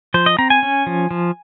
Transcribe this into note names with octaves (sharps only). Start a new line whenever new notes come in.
F3 C5
D#5
C4 A#5
G#5
C#4
F3
F3